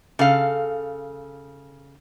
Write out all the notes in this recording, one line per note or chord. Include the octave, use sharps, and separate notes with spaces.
C#3 A4 F5